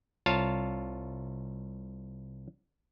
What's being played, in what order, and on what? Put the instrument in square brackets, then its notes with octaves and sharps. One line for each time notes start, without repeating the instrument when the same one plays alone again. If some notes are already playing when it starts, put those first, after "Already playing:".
[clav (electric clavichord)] C2 F4 C#5 F5 A5